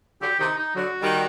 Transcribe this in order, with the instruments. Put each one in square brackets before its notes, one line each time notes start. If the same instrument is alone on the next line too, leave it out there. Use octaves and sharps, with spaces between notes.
[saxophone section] D3 F#3 [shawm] G4
[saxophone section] C3 D#3 [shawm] D#4
[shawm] D#4
[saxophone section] D3 F#3 [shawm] F#4
[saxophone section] D#3 G3